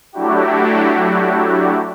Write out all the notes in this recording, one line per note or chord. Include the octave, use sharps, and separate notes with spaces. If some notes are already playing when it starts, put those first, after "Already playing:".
F#3 A3 D4 E4 F#4 G4